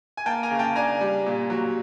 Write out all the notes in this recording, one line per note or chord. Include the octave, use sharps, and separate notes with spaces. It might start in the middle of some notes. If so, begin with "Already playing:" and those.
G#5
A#3 G5 A5
G#5 A#5
C#3
G5 A5
D4 G#5 A#5
G3
A#2
F#3